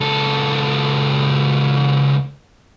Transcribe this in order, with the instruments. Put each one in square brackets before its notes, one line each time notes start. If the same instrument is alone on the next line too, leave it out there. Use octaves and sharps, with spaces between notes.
[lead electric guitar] C#2 A4